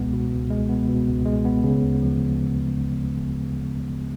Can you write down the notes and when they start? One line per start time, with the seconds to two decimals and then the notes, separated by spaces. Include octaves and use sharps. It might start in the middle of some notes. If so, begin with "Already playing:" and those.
Already playing: C#2 B2 G#3 B3
0.13 B2
0.32 C#2
0.50 G#3
0.69 B3
0.89 B2
1.08 C#2
1.26 G#3
1.45 B3
1.64 C#3
1.83 D2
2.02 F3